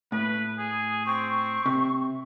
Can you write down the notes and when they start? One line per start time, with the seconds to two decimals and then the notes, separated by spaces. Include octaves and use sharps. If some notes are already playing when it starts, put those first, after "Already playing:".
0.12 A2 B4
0.58 G#4
1.06 C4 C#6
1.66 C3